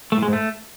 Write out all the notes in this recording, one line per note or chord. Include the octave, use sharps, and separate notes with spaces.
A3
A2
G#3
G#2
A3